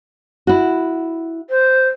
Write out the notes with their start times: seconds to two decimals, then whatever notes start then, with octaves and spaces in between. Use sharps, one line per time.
0.47 E4 F#4
1.50 C5